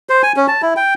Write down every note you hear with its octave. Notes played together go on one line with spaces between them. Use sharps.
C5
G#5
C#4
A5
E4
G5